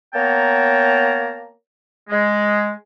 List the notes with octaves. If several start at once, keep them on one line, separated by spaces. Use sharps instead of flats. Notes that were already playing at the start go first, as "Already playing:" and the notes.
A#3 B3 C#5 G5 A5 A#5
G#3